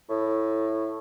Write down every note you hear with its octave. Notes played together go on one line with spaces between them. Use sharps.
A2